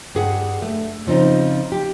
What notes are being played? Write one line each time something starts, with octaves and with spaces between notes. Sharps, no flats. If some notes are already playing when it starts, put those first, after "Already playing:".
G2 G#4 F#5
A3
C#3 F3 C4 D#4
G4